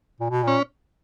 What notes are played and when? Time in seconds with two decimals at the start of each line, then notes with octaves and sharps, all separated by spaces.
0.20 A#2
0.30 B2
0.43 A#2 C#4